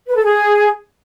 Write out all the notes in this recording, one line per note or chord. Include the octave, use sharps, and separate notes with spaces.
B4
A4
G#4